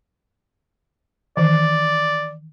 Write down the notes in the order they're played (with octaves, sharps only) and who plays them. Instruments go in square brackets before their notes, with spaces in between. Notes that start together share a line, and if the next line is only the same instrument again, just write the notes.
[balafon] D#3 E3 [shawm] D5